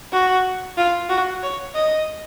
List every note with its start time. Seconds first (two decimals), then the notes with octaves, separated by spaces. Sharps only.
0.13 F#4
0.77 F4
1.09 F#4
1.43 C#5
1.74 D#5